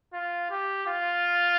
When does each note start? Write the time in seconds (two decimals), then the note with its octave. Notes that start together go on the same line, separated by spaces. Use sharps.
0.13 F4
0.50 G4
0.87 F4